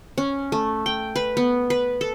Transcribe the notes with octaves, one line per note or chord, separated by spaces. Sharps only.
C#4
A3
G5
B4
B3
B4
A4